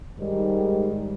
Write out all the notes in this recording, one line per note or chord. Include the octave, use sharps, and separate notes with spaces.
G#2 D#3 G3